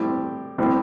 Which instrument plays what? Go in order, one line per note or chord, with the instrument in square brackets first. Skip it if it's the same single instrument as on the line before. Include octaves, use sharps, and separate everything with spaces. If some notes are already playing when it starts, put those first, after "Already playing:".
Already playing: [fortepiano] A2 G3 C4 G4
A2 G3 C4